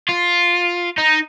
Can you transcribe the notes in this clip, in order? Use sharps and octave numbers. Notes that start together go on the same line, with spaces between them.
F4
D#4